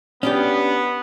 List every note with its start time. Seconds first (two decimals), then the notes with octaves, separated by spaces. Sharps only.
0.23 B3 C#4 D4 G4